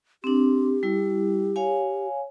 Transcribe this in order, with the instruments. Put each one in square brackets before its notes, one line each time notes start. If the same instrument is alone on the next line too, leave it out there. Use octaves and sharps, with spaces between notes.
[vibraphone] C4 D4 [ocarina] G4
[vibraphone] G3 E4
C#5 F5 G#5